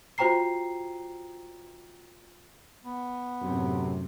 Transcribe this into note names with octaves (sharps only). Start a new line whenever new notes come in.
F4 F#4 C5 G5 A#5 C7
B3
F#2 A2 C3